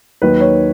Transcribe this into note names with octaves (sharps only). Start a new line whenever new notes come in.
D#2 D#3 F#3 B4
C#5